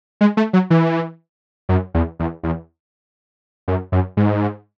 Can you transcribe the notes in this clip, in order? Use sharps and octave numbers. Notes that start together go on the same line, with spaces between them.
G#3
A3
F#3
E3
F#2
E2
E2
E2
F#2
F#2
G#2